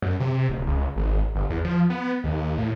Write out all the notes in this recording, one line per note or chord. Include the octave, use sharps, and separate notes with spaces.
F#2
C3
D1
C#2
G#1
G1
E2
F3
B3
D#2
A2